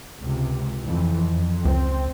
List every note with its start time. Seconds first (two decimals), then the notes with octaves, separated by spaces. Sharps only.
0.21 C#2 C3
0.85 F2 E3
1.33 F2
1.65 C#2 C4